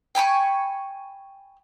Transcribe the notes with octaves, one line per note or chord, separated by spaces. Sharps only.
G5 G#5 B5 C#6